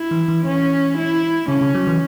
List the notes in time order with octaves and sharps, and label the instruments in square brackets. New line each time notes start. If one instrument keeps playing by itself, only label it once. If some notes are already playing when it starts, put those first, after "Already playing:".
Already playing: [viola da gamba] E4
[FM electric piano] E3
E3
[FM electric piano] E3 [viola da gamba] C#4
[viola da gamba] E4
[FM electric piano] C#3 [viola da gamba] C#4
[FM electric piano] C#3
F#3
E3